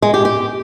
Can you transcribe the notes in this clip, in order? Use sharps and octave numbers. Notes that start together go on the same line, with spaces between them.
G#3
G4
G4